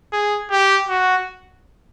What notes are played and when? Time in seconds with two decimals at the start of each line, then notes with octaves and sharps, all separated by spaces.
0.13 G#4
0.51 G4
0.89 F#4